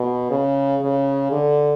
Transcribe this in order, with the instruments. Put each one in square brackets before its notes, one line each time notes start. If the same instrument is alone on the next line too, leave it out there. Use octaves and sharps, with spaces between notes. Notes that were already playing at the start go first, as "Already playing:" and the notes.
Already playing: [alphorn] B2
C#3
C#3
D3